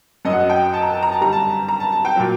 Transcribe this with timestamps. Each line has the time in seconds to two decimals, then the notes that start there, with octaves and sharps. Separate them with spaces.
0.25 F#2 D#5
0.29 F#3 F#5
0.41 D#5
0.50 G5
0.73 A5
0.82 A#5
0.93 A5
1.03 A#5
1.12 A5
1.21 G2 D3 G3 A#5
1.32 A5
1.68 A#5
1.80 A5
1.92 A5
2.05 G5
2.16 A#2 F#3